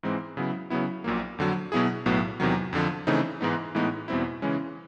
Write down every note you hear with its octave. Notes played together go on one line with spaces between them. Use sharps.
G#2 E3 G#3 C4
C#3 F#3 B3 E4
C#3 F#3 B3 E4
A#1 A#2 F#3 A#3
F2 D3 F#3
B2 F#3 B3 E4 G#4
B1 A2 F#3 B3
E2 C3 D#3 F#3
F2 D3 F3
C#3 E3 A3 C4 D#4
G#2 E3 G#3 B3 D#4
A2 E3 G#3 B3 D#4
E2 B2 G3 C4 E4
C#3 E3 G#3 C#4